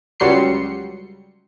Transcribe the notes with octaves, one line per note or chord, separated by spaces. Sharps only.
C#2 F#3 G3 C6 C7 C#7